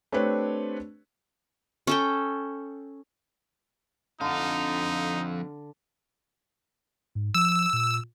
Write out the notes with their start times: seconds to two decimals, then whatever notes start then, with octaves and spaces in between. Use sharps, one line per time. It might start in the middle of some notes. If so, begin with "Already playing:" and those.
0.12 A3 C4 D4 G4 B4 C#5
1.87 C#4 A4 G5
4.21 F2 D3 D#4 F5
7.15 G#2
7.35 F3 E6
7.73 A#2